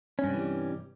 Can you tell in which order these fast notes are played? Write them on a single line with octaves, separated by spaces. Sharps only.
C#4 G2 C3 E3 G3